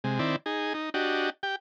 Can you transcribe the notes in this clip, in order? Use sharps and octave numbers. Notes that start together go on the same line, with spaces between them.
C3 G#3
D#3 C4 E4 D5
D#4 G#4
D#4
D4 F#4 G4 D#5
G4 G5